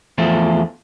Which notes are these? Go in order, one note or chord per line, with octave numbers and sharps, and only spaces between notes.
E2 F3 A3